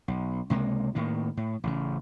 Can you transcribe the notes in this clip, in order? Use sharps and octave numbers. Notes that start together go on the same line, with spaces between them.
B1
C#2 C3 G#3 A#3
A2 D#3 A#3
A2
A1 C#3